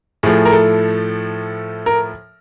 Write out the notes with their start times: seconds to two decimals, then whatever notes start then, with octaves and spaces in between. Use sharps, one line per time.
0.23 A2 F3 A3 G#4
0.45 A#4
0.52 A4
1.86 A#4